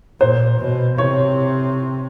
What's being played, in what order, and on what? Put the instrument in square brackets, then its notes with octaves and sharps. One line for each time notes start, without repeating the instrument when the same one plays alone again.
[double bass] A#2 [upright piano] C5
[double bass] B2
[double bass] C3 [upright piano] C#5